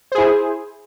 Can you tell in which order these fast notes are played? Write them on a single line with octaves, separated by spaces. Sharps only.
C5 G#4 E4